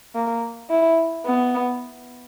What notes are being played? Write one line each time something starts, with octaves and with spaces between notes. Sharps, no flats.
A#3
E4
B3